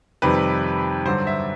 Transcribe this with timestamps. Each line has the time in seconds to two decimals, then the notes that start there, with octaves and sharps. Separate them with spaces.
0.22 F2 C3 D#3 G3 B4
1.05 G2 D3 F#3 C5
1.27 E5